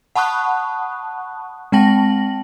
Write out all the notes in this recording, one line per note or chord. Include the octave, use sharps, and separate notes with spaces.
F#5 A5 B5 C#6 D#6 F#6
G#3 C4 G5 A5 A#6 F#7